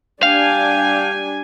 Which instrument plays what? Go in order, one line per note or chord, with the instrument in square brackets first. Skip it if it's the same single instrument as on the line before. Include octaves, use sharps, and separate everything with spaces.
[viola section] G3 D4 G#5 [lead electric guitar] F5 [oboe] G5